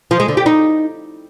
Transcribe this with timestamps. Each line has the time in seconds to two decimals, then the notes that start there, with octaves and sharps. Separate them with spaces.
0.11 F3
0.20 G#3
0.28 D3
0.37 G4
0.46 D#4